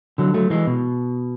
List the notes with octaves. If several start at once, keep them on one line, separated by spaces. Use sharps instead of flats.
D3 F#3
F#3 A3
E3 G#3
B2